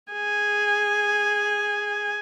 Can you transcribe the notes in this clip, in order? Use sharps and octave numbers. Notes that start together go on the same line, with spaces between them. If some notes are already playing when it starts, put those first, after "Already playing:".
G#4 G#5